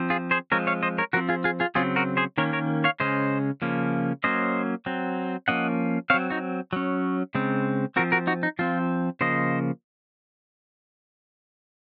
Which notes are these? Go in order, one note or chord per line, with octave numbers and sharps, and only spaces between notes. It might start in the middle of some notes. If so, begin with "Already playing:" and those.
Already playing: F3 C4
F4 G#4
G#4 C5
F3 G#3 C4 A#4 C#5
C#5 F5
C5 D#5
A#4 C#5
F3 C4 F#4 A#4
F4 G#4
F4 G#4
F4 G#4
C#3 F#3 C4 F4 G#4
F#4 A#4
G#4 C5
D#3 A#3 C#4 A#4 C#5
A#4 C#5
C#5 F5
C#3 G#3 C#4 C5 D#5
C#3 F3 A#3 C#4
F#3 A#3 C#4 C5 D#5
F#3 C4
F3 A#3 C#4 D#5 F#5
F#3 C4 C#5 F5
D#4 F#4
F#3 C#4
C#3 G#3 C4
F3 C4 F#4 A#4
F#4 A#4
D#4 F#4
D#4
F3 C4 F4
C#3 F3 A#3 C5 D#5